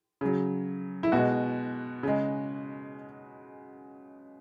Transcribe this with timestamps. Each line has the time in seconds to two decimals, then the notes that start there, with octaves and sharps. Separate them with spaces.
0.21 C#3 F#3
1.03 E4
1.12 B2 G#3 F#4
2.03 C#3 G#3